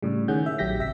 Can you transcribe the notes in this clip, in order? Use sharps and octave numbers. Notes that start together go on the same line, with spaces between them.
A2 C#3 G3
D#3 C#4 G#4 F#5 G6
E5
A#1 F#3 G4 G6 A#6 B6
G1 C3 E5 B6